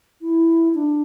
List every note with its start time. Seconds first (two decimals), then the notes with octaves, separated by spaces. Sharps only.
0.21 E4
0.74 D4